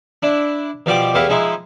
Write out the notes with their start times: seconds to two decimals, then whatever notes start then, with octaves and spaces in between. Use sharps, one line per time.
0.23 D4 E4
0.86 B2 F3 G3 D5 G5 D6
1.14 E2 A3 B3 E4 G4 F5
1.29 F3 G#3 D#4 E4